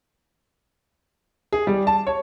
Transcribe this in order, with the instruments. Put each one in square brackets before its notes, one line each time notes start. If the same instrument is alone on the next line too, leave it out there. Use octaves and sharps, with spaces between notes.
[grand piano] G#4
G3
A5
C#5